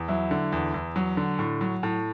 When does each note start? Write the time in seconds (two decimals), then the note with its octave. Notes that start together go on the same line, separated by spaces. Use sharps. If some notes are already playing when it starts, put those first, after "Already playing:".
Already playing: E2
0.08 F#3 E4
0.31 D3
0.52 E2
0.74 E2
0.96 F#3
1.17 D3
1.39 A2
1.61 F#3
1.83 A2